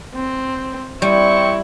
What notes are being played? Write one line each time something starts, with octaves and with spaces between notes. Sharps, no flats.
C4
G3 C4 E4 C#6